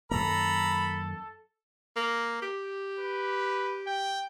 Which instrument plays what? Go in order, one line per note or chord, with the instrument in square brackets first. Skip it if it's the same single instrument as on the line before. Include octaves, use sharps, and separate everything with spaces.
[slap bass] F#2 D#3 A#3 [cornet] A4 [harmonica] A#5 B5
[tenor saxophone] A#3
G4
[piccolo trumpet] B4
G5